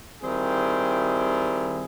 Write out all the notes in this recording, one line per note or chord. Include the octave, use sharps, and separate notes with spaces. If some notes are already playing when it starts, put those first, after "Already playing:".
D#3 G3 C4 E4 G#4